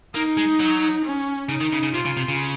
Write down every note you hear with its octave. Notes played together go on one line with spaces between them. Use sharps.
A#3 D#4
G#3
F#3
C#4
C#3 D#4
D#3
C#3
C#3
C3 F4
C#3
C3
C#3